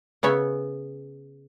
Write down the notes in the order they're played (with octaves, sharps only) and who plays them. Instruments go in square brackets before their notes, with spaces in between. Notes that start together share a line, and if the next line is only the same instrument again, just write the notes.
[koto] C#3 B3 C#5 E5